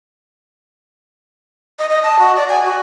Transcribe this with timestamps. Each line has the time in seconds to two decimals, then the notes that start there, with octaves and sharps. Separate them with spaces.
1.79 D#5
1.90 D#5
2.03 A5
2.19 F#4
2.36 D5
2.49 G#5
2.65 F#4